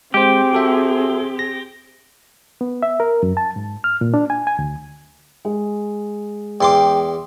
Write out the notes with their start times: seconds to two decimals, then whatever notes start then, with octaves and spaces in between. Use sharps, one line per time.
0.14 G#3 C4 G4 G#4 C5
0.53 F#4 A4 E5
1.39 A#6
2.61 B3
2.83 E5
3.00 A#4
3.23 F#2
3.37 A5
3.56 G#2
3.84 F6
4.01 A#2
4.14 D4
4.30 G#5
4.47 G#5
4.59 D2
5.45 G#3
6.61 E2 G5 C6 D6